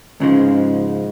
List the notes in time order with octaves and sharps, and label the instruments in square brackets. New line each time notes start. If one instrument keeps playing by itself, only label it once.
[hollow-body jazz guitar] C#2 C#3 F3 G#3 [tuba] G#2